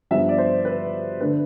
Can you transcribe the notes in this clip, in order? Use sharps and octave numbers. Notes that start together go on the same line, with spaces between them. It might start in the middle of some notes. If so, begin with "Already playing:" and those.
G2 F3 B3 D4 E5
D5
C5
B4
D3 A3 D4 B4